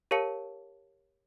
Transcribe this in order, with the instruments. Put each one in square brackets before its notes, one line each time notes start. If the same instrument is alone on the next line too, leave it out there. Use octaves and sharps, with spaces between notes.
[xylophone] G4 A#4 C#5 F5 A5 C#7